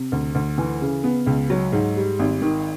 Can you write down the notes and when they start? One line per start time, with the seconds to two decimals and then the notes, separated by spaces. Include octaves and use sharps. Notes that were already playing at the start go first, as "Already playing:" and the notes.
Already playing: C3
0.12 D2
0.35 D2
0.58 E3
0.81 C#3
1.04 B3
1.26 C#2
1.50 F#3
1.72 G#2
1.96 G3
2.19 G#1
2.42 D#3